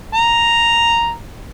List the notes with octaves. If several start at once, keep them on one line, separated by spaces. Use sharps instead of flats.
A#5